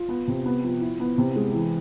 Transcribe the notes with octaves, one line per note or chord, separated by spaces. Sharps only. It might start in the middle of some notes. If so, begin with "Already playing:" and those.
Already playing: F4
B3
C3
B3
F3
E4
B3
C3
G#3
E3